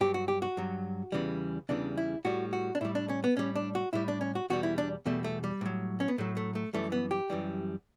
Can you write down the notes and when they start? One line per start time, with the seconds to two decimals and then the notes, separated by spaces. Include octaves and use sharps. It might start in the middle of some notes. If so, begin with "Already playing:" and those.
0.01 G2 F#3 G4
0.14 F#4
0.28 G4
0.42 F#4
0.57 G2 F#3
1.12 E2 C#3 E3 G3
1.69 E2 C#3 E3 G3 D4
1.97 E4
2.25 A2 G3 F#4
2.53 F#4
2.75 D4
2.81 A2 G3 E4
2.95 D4
3.09 C#4
3.24 B3
3.37 A2 G3 C#4
3.55 D4
3.75 F#4
3.93 A2 G3 E4
4.08 D4
4.21 C#4
4.35 F#4
4.50 E2 B2 G3 F#4
4.63 E4
4.78 D4
5.06 E2 B2 G3 A3
5.24 A3
5.44 G3
5.61 A2 F#3
6.00 C#4
6.08 B3
6.18 A2 F#3 A3
6.37 A3
6.55 A3
6.73 F#2 E3 G3 A3
6.92 B3
7.11 G4
7.30 F#2 E3 G3